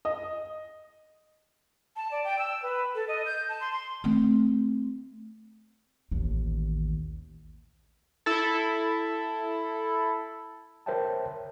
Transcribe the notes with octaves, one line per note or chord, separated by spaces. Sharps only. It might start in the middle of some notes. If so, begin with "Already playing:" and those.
D#5
A5
D5
G5
E6
B4
A4
D#5
G6
A5
C6
C6
A3 C4
A1 D#2
E4 A4
A#4 C5 C#5 E5 G5 A5